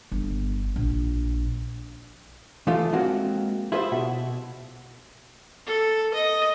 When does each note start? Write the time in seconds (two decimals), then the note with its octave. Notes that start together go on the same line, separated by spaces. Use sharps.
0.12 G1
0.76 A#1
2.67 E3 F3 A3 F4
2.93 G#3 A#3 C4 F#4
3.72 E4 F4 G#4 C5 E5
3.92 B2
5.66 A4
6.14 D#5